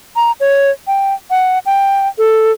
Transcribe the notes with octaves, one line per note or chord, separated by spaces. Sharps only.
A#5
C#5
G5
F#5
G5
A4